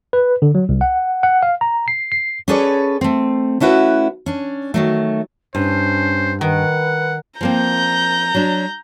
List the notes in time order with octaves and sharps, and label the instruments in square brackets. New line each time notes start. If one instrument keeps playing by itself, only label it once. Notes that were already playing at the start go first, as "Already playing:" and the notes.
[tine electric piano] B4
D3
F#3
C2
F#5
F#5
F5
A#5
C7
C7
[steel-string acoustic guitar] C#4 G#4 A4 B4 C#5 D5
A3 C4
A3 C#4 E4 F#4 B4
C#4 D4
D#3 F#3 A3
[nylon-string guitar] G2 [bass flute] C#4 [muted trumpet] C5
[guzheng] D#3 [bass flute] B4 [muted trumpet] F#5
[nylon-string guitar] F3 A#3 C4 [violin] A#5 G6
[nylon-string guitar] F#3 D4